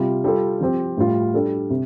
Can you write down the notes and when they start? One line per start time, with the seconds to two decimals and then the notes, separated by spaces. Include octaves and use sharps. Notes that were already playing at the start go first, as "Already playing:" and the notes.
Already playing: C3 G3 F4
0.24 G3 F4 A4
0.61 F3 C4 G4
0.97 A2 G3 F4
1.34 G3 D4 A4
1.70 C3